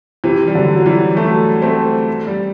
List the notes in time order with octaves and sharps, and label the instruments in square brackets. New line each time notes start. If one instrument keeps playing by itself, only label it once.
[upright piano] C3 E3
G3
D3 F#3
F#3
E3 G3
F#3 A3
A3 C4
G3